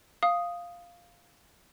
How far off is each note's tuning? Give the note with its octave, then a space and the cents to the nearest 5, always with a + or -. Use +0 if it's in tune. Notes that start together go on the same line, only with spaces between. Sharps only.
F5 +0 D#6 +0